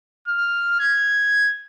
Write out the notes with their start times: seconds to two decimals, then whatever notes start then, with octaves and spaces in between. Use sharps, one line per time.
0.28 F6
0.80 G#6